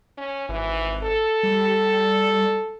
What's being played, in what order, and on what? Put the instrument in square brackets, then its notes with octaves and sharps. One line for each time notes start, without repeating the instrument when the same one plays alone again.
[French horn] C#4
[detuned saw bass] G#1 [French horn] E3
[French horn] A4
[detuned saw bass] G3